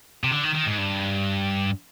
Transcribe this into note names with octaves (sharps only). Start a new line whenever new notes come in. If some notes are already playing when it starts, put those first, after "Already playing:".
C3
D3
D#3
D#3
G#2
G2